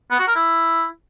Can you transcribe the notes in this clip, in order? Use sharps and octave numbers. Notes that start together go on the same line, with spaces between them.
B3
F#4
A#4
E4